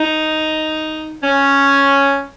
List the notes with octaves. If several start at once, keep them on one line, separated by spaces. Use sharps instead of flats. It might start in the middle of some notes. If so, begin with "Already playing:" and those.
Already playing: D#4
C#4